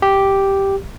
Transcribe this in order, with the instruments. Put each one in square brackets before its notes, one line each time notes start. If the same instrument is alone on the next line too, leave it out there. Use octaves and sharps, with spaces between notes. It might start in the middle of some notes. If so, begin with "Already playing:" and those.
[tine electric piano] G4